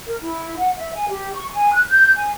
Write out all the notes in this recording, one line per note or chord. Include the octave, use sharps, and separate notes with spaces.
A#4
E4
F#5
E5
G#5
G4
C#6
G#5
F#6
G6
G#5